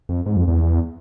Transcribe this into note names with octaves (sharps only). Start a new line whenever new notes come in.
F2
G#2
F2
E2